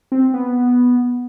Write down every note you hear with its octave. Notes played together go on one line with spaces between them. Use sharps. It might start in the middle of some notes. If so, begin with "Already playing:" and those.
C4
B3